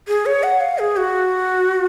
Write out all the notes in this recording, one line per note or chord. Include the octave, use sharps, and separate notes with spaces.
G#4
C#5
F#5
F5
G#4
F#4